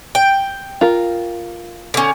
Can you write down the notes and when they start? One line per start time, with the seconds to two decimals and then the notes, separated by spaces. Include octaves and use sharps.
0.15 G5
0.81 F4 A#4
1.94 D3 C#4